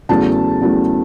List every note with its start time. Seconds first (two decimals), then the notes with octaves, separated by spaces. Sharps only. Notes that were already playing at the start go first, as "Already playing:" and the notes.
0.09 E2 C#3 F#3 A3 E4 A5
0.61 E2 C#3 F#3 A3 E4